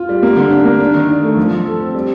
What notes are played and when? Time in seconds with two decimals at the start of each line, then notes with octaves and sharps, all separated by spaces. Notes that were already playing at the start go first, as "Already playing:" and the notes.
Already playing: F4
0.09 G3
0.23 A#3
0.36 D3
0.51 D4
0.65 A#3
0.80 D4
0.94 D#3
1.09 D4
1.23 A3
1.37 F3
1.51 F3
1.66 A4
1.80 C4
1.95 G3